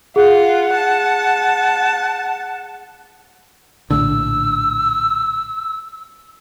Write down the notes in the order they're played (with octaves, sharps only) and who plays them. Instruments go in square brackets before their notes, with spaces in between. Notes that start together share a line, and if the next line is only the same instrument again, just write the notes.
[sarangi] F4 [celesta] G#4 [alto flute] F#5
[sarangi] A5
[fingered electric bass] A#1 A2 D3 [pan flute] E6